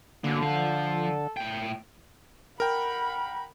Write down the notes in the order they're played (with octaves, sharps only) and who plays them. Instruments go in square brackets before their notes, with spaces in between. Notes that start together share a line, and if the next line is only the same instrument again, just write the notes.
[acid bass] D3 [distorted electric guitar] A#3 F#4
[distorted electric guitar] F3 F5 [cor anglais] A4
[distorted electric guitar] A2 G5
[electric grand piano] A#4 G5 [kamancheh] F#5 B5